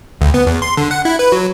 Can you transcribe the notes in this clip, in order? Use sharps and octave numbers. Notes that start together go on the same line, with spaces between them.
D2
B3
E2
C6
D3
F#5
E4
B4
F#3